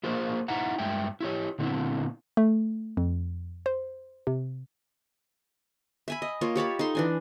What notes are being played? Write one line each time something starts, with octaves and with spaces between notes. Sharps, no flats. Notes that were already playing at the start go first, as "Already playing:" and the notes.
A#3 F4 G#4 A#4 C5
D#4 E4 F#5 A#5
G2 G#3 E5 G5
E4 G4 C#5
A#2 D3 B3 C4 E4
A3
F2
C5
C3
E5 G#5 B5
D#5
A#3 F4 C#5
G4 C#5 A5 B5
D#4 A4 C6
E3 D4 G#5